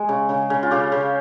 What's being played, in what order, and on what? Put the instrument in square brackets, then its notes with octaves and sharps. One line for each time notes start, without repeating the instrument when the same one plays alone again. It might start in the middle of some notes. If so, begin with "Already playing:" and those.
Already playing: [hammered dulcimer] G#3 G#4
C#3
C#3
C#3
F4
C#3 G4
C#3